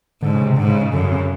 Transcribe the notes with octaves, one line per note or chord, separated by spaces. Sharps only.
G#2 D3
C#3
C3
G#2 D3
C#3
C#3
F#2 D3
C#3
C3
C#3